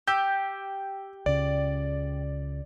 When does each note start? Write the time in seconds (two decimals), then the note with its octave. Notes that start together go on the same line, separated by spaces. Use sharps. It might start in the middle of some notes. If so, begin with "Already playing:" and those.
0.08 G4 E6 G6
1.26 C#2 C#3 D5